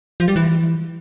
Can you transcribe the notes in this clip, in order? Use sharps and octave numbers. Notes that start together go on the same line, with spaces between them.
F3
G3
E3